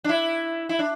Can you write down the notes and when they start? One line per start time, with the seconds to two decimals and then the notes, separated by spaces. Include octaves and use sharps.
0.04 D4
0.09 E4
0.69 E4
0.79 D4